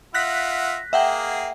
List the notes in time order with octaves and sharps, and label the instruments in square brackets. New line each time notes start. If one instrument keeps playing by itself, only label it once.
[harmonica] F4 E5 F#5 [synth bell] F#6 A#6 B6
[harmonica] A#3 G#4 [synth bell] E5 F#5 G5